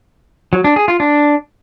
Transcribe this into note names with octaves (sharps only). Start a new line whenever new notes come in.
F#3
D4
G#4
F4
D4